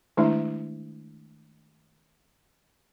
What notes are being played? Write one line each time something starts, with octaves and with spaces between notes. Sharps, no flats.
D#3 G#3 A3 D4 E4